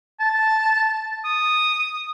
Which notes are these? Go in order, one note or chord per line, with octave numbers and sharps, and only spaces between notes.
A5
D#6